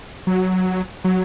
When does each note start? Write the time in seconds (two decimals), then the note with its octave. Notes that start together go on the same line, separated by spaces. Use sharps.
0.27 F#3
1.04 F#3